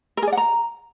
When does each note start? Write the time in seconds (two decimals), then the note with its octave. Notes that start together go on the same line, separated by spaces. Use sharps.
0.17 A#4
0.22 G#4
0.27 D5
0.32 F#5
0.37 A#5